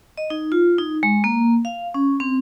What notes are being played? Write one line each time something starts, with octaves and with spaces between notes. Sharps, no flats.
D#5
D#4
F4
D#4
G#3
A#3
F5
C#4
C4